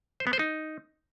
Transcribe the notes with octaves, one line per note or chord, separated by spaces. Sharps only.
C5
B3
C5
D#4